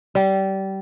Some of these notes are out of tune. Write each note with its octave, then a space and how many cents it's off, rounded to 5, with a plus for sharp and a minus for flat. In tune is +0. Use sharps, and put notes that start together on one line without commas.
G3 -25